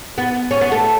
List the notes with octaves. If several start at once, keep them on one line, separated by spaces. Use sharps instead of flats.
B3
C#4
B3
A3